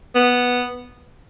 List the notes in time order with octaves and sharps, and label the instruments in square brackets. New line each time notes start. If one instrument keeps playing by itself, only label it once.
[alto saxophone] B3